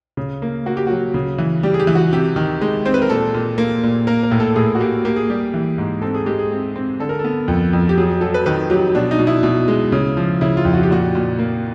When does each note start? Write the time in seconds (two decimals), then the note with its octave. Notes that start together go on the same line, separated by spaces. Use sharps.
0.17 C#3
0.42 A#3
0.66 A#3 F#4
0.77 G4
0.87 F#3 F#4
1.14 C#3
1.38 E3
1.63 G3 G4
1.74 G#4
1.80 G4
1.87 E3
1.95 F#4
2.13 C3 G4
2.36 D#3
2.62 G#3
2.85 C4 C5
2.94 B4
3.02 A#4
3.10 A#2 A4
3.34 A#2
3.58 A#3
3.83 A#2
4.07 A#3 A#4
4.23 A#4
4.31 A2
4.40 A4
4.56 A2 G#4
4.75 F#4
4.80 A#3 G4
5.05 A#3 G4
5.16 G#4
5.30 G3 G4
5.54 E3
5.78 G#2
6.02 C4 A4
6.14 G#4
6.26 G#3 G4
6.39 G#4
6.51 C4
6.76 C4
7.00 D3 A4
7.09 A#4
7.19 A4
7.24 B3
7.48 F2
7.73 F2
7.89 G4
7.97 F#3 G#4
8.21 F#3 A4
8.34 B4
8.46 D#3 B4
8.70 F#3 G4
8.95 B2 D4
9.11 D#4
9.19 B2
9.27 E4
9.43 B2
9.68 G#3
9.92 C#3
10.17 F3
10.41 C#3 E4
10.57 F4
10.65 F2
10.74 F#4
10.83 G4
10.90 A#2 F#4
11.15 A#2
11.39 A#3